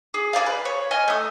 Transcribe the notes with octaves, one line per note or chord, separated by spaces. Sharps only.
G#4
G#4 A#4 D5 F5
B4
C#5
D#5 G#5 F6
A3 D#6